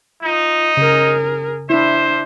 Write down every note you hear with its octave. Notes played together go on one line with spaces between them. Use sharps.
D#4 F4
C#3 G#4 A#4
D4 E4 C5 E5